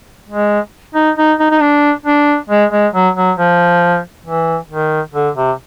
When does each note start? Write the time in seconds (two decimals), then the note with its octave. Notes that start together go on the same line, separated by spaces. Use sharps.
0.29 G#3
0.95 D#4
1.18 D#4
1.40 D#4
1.50 D#4
1.61 D4
2.06 D4
2.49 G#3
2.72 G#3
2.94 F#3
3.16 F#3
3.37 F3
4.26 E3
4.70 D#3
5.14 D3
5.36 C3